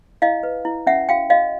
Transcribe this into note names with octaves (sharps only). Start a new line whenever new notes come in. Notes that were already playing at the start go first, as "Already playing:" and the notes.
E4 D#5 F5
B4
E4
C#4 E5 F#5
F#4 F5 G5
F#4 D#5 F5